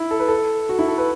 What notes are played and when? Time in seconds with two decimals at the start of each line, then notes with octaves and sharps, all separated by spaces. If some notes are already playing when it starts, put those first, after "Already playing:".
Already playing: E4
0.11 A4
0.20 B4
0.28 A4
0.69 F#4
0.79 E4
0.88 A4
0.98 B4